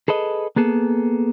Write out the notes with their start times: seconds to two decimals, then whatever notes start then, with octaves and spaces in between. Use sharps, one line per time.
0.08 G#4 A4 B4 D#5
0.56 A#3 B3 G#4 A4